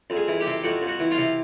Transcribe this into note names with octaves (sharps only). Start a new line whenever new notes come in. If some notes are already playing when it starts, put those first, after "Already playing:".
F2
G#4
E3
G4
C3
F2 F#4
F2
F#4
E3
F4
C3